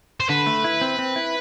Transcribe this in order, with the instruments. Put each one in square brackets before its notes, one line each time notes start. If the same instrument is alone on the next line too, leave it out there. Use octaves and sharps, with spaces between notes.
[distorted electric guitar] C5
[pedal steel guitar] D3 [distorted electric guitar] B4
[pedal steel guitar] A3
E4
C4
C4
E4